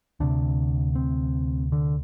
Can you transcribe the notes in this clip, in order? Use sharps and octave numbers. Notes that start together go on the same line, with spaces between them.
D2 C3 D4
C4
D3